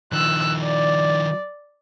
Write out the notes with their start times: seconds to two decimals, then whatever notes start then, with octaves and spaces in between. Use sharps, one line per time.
0.12 D#3 F3 E6 F#6
0.65 D5